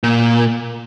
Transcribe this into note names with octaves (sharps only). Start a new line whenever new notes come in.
A#2